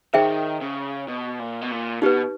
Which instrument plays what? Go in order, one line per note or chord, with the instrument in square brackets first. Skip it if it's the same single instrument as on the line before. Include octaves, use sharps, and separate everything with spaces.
[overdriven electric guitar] D#3 [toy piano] G#4 C5 E5 G5
[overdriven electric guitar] C#3
B2
A#2
B2
A#2
[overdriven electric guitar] B2 [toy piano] D#4 G4 B4